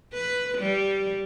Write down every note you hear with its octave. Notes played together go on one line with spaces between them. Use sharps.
B4
G3